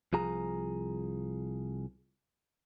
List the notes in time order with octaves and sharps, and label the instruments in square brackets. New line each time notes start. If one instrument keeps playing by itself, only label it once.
[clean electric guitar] C2 F3 G#4 A#5